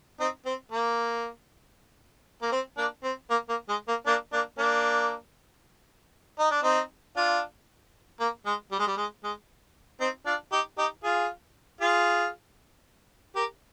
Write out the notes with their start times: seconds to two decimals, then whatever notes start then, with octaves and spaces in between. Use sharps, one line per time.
0.20 C4 D#4
0.45 C4
0.72 A#3
2.42 A#3
2.52 C4
2.78 A#3 D4
3.03 C4
3.30 A#3
3.49 A#3
3.69 G#3
3.88 A#3
4.07 A#3 D4
4.33 A#3 D4
4.58 A#3 D4
6.39 D#4
6.51 D4
6.63 C4 D#4
7.16 D4 F4
8.20 A#3
8.46 G#3
8.71 G3
8.79 G#3
8.87 G3
8.97 G#3
9.23 G#3
10.00 C4 D#4
10.26 D4 F4
10.52 D#4 G4
10.78 D#4 G4
11.03 F4 G#4
11.81 F4 G#4
13.36 G4 A#4